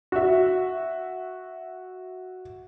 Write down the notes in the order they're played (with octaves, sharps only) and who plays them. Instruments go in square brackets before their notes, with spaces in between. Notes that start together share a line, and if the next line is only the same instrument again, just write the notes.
[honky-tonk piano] F#4 E5